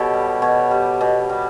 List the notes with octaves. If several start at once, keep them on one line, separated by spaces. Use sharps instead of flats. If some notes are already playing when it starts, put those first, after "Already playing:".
Already playing: B2 G4 A4 C#5
G3
B2 C#5
G3
B2
G3